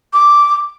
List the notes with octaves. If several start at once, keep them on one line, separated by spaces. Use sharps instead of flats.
D6